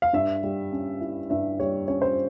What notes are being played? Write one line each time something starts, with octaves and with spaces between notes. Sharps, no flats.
F5
G2 E5
G3
C#4
E4
G2 E5
G3 C#5
C#4 C#5
C5